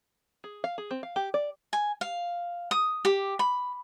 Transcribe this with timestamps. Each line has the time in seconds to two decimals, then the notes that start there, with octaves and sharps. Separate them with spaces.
0.44 G#4
0.64 F5
0.78 G#4
0.91 C4
1.03 F5
1.16 G4
1.34 D5
1.73 G#5
2.01 F5
2.71 D#6
3.05 G4
3.39 B5